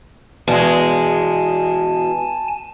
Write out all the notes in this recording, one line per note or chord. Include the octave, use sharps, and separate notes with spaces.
E2 B2 G#3 G#5 A5